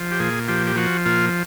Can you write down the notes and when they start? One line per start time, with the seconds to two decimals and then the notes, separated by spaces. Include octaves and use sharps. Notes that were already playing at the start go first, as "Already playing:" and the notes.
Already playing: F3
0.11 G4
0.20 A#2 G#4
0.48 F3 G4
0.67 G4
0.76 F3 F#4
1.06 A#2 F4